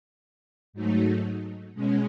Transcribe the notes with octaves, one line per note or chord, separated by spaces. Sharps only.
G#2 F#3 A3 D#4
B2 G#3 C#4